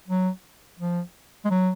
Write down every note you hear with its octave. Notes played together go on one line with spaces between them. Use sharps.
F#3
F3
G#3
F#3